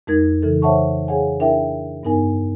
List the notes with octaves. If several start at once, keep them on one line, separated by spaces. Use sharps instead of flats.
F2 G#3 D#4 A#4 G#6
C#3 E3 A4
C5 C#5 E5 F#5 A5 C#6
G#4 C#5 F5 F#5 G#5
D4 E4 A#4 E5 G5
G2 B3 D#4 A#4 G#5